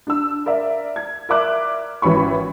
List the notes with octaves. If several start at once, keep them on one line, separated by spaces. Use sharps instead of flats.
D4 E6
A#4 D5 E5
G#6
A#4 D5 E5 D6 F#6
G#1 E3 C#4 B5 C#6